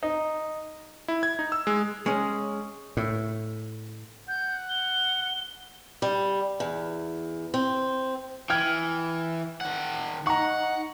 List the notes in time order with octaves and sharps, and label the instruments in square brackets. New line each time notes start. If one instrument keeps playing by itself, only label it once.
[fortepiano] D#4
[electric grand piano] E4
G#6
D#4
E6
G#3
[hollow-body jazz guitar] G#3 C#4 [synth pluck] G#5 C#6 D#6
[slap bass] A2
[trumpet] F#5 [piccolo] G6
[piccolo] G7
[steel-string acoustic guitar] G3
E2
C4
[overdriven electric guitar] E3 [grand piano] G5 F6 G#6
[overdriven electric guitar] D#3 F#5
[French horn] D#4 [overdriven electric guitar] F#5 [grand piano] A#5 C#6